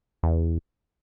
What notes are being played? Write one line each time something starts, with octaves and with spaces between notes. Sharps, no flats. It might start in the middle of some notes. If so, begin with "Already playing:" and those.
E2